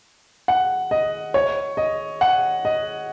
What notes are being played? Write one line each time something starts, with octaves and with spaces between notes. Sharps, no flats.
F#5
D#5
C#5
D#5
F#5
D#5